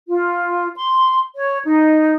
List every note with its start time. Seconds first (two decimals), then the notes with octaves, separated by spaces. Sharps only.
0.08 F4
0.77 C6
1.36 C#5
1.65 D#4